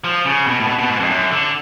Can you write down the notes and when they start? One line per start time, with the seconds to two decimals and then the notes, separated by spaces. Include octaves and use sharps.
0.04 F3
0.25 C#3
0.47 B2
0.60 A2
0.67 B2
0.79 B2
0.89 G#2
1.00 F2
1.10 F#2
1.31 D3